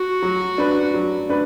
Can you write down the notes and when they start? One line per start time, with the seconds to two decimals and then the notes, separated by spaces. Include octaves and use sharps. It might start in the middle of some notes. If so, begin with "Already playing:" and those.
Already playing: F#4
0.22 F#3
0.58 D4 B4
0.94 F#3
1.29 D4 B4